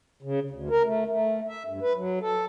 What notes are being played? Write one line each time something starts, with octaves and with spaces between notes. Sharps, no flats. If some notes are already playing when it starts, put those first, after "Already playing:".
C#3
D2
A#4
A3
A3
E5
G2
B4
F#3
A4